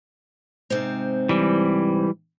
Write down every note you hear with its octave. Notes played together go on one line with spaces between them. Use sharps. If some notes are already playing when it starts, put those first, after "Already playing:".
G#2 C3 C4
E3 G3